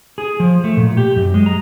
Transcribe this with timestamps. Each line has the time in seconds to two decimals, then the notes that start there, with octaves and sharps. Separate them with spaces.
0.18 G#4
0.40 F3
0.64 A3
0.77 A#2
0.97 G4
1.16 F#2
1.34 G#3
1.46 A#5